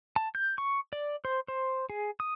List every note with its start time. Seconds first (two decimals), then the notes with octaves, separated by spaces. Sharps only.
0.16 A5
0.35 G6
0.58 C#6
0.93 D5
1.25 C5
1.48 C5
1.90 G#4
2.20 D#6